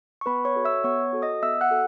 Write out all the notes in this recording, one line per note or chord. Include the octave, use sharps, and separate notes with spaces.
C#6
B3 B4 B5
C#5 C#6
F#4 A4
E5 E6
B3 C#5 C#6
F#4 A4
D#5 D#6
B3 E5 E6
F#5 F#6
F#4 A4